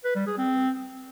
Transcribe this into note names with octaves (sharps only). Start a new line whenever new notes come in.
B4
G3
G#4
C4